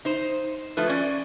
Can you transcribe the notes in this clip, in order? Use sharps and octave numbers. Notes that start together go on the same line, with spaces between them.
D#4 C5
F3 A3 F4 B4
C#4 D5